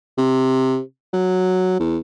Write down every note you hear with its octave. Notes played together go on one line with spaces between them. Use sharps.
C3
F#3
E2